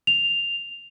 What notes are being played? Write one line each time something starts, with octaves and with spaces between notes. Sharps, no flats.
F7